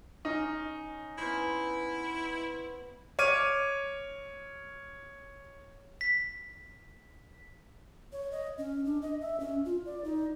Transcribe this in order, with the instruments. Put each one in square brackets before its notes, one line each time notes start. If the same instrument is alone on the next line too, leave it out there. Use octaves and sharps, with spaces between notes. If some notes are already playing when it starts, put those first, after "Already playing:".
[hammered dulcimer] C#4 [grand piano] D#4
[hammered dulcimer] B3 C#4 C5 [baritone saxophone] E4
[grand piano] C#5 D6 F6 D#7
[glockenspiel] B6
[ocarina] C#5
D#5
C#4
D4
D#5
E5
C#4
F4
D5
D#4